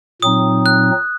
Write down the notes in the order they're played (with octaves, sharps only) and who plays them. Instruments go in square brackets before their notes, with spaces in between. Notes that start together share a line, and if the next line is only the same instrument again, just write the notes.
[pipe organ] A#2 F#3 C4 D#4 [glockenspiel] D#6
[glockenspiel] F#6